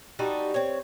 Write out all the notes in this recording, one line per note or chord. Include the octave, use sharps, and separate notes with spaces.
G3 D#4 F#4 A4
C4 C#5